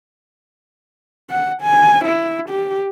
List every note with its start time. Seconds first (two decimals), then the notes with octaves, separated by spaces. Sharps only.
1.31 F#5
1.63 G#5
2.06 E4
2.50 G4